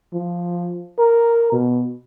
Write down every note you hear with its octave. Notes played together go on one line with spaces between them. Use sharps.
F3
A#4
B2